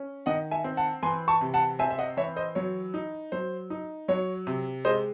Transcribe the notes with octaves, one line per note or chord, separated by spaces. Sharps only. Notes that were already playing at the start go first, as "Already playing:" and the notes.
Already playing: C#4
D#3 D#5 F#5
E5 G#5
C4
F#5 A5
E3 G#5 C6
A5 C#6
C3
F#5 A5
C4 E5 G#5
E5
D#5 F#5
E3 C#5 E5
C5 D#5
F#3 C#5
D#4
F#3 C5
D#4
F#3 C#5
C3
G#3 C5 D#5